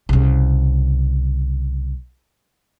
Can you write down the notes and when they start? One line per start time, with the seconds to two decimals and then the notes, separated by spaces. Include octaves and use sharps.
0.09 C2 C#3